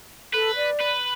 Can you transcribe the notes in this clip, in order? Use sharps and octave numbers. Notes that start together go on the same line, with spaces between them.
A4 B4
D5
B4